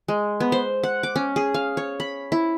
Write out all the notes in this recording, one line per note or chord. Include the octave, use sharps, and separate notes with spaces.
G#3
B3
C5
F#5
D6
C#4
G#4
F5
C#5
B5
E4